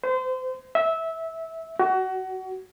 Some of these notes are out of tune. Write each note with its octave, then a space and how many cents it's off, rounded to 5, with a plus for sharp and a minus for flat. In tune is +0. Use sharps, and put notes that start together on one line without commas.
C5 -30
E5 -15
F#4 +25